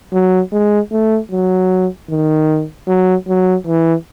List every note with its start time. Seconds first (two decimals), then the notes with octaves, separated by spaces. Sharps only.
0.13 F#3
0.53 G#3
0.92 A3
1.32 F#3
2.10 D#3
2.88 F#3
3.28 F#3
3.67 E3